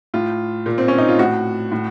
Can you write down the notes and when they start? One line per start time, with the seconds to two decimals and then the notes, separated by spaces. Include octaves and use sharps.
0.14 A2 F4
0.66 A#2
0.78 C4
0.88 C#4
0.98 D#4
1.08 F4
1.19 A2 F#4
1.72 A2